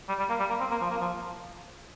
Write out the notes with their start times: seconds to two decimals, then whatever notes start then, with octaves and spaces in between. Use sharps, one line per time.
0.08 G3
0.19 G3
0.29 A#3
0.39 G3
0.49 A#3
0.60 C4
0.71 A#3
0.81 F3
0.90 A#3
1.01 F3